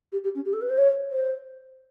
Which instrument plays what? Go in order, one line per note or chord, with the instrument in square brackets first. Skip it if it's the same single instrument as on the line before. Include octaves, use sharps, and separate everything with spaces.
[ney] G4
G4
C#4
G4
A4
B4
C5
C#5
C5